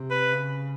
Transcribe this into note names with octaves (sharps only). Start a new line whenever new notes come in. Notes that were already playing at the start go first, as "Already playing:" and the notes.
Already playing: C3
B4
C#3